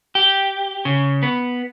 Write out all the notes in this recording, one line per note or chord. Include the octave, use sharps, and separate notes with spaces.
G4
C#3
B3